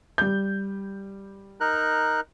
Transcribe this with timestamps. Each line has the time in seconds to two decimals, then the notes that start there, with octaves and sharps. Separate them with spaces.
0.18 G3 G6
1.61 D#4 A#4 F#6